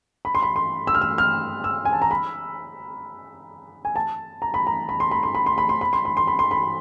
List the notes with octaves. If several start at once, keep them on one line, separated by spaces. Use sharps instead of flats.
B5
C6
B5
C6
E6
F6
E6
F6
E6
G#5
A5
A#5
B5
G#5
A5
A#5
B5
A#5
B5
C6
B5
C6
B5
C6
B5
C6
B5
C6
B5
C6
B5
C6
B5